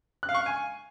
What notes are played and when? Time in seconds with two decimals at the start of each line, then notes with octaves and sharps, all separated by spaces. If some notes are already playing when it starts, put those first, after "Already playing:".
0.23 F#6
0.29 F5
0.35 C#6
0.40 F5
0.46 G#5